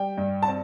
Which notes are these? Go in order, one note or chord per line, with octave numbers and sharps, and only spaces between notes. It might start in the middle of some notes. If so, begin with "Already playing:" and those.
Already playing: G3 G5
G2
A5
C4